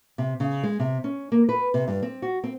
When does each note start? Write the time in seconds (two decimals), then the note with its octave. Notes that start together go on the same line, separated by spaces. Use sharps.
0.18 C3
0.40 C#3
0.63 G#3
0.80 C3
1.04 C#4
1.32 A#3
1.49 B4
1.74 C3
1.88 G2
2.03 C4
2.22 F#4
2.44 C4